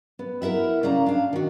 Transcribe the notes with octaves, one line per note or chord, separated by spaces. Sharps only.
B3
E4 A#4 E5 F#5
C#3 A#3 D5 F#5 A#5
D4 F5
D#3 F#4